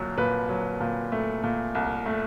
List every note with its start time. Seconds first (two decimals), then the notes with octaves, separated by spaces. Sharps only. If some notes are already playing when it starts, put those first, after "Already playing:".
Already playing: C2 A#2 F#3
0.17 A#2 B4
0.49 F#3
0.80 A#2
1.12 A3
1.44 A#2
1.75 C2
2.06 A3